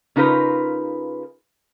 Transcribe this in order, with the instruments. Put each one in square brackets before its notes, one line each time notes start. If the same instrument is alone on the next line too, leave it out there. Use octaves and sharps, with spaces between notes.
[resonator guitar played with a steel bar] C#3 D#4 F4 A#4 B4